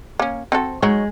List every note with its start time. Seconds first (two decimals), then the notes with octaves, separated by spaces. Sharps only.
0.20 A#3 C#4
0.52 C4 F#4 A4
0.82 F#3 G#3 D#4 C#5